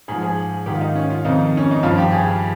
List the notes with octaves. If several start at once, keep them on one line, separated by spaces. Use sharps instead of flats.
G#2 F3 G#4
G#4
G#2 D#3 G4
F4
D#4
C#4
F4
F2 C3 D#3 D#4
C#4
D#4
G2 F3 F4
G4
G#4